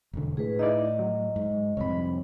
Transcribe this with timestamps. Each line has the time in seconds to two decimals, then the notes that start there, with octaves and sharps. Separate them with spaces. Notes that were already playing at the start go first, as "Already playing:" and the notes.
0.13 E1 D3
0.37 A2 G#4 B4
0.59 D#4 E4 D5 D#5
0.99 F#3
1.36 G#2
1.77 C2 F2 C#5 B5